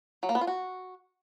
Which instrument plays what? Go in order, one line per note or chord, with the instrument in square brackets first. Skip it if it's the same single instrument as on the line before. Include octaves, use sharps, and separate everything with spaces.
[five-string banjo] F#3
A#3
B3
F4
F#4